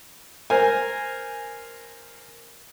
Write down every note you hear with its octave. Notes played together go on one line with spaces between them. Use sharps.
A#4 C5 G#5